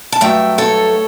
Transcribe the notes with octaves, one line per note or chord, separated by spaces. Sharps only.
A5
G2 F#3 A3 E5 G5
A4 C#5